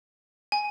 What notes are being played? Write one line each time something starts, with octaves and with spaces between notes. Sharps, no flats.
G#5